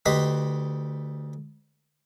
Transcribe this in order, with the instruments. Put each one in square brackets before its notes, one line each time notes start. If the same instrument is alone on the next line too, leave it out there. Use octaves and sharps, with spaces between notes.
[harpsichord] D2 G4 B4 D#5 B5 C6